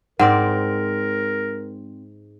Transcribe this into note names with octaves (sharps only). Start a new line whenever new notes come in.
G#2 C4 A#4 D5 F#5